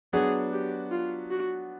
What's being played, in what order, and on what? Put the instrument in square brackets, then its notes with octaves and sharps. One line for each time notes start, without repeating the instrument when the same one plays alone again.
[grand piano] F#3 B3 D4 F#4 [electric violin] G#4
[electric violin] G4
F4
F#4